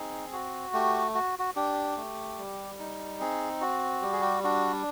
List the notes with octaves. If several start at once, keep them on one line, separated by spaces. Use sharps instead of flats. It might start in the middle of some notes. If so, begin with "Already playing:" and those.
Already playing: C4 D#4 G#4
F#4
A3 G4
F#4
F#4
D4 G4
A3
G3
D#4
C4 G#4
F#4
G3 G4
G#4
G4
D4 F#4